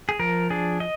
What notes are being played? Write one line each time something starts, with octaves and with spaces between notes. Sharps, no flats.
G#4
F3 A#4
D4 G#4
D#5